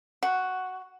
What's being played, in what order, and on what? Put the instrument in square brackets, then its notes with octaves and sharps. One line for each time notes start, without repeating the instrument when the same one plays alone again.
[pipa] F#4